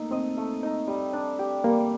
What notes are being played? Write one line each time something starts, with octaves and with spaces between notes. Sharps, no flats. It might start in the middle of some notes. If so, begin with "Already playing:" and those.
Already playing: A3 A#3 D#4 A4
C4 D#5
A3
D#4
G3
D4
G4
G3 A#3